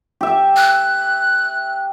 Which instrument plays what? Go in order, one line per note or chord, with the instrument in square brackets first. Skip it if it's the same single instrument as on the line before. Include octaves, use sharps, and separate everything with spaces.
[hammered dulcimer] G4 E5
[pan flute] F#6